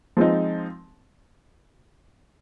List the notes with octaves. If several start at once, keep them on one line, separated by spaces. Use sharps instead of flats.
F3 G#3 C4 D#4